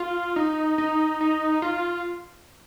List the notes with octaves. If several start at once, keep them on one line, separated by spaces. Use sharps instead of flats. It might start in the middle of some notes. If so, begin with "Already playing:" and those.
Already playing: F4
D#4
D#4
D#4
F4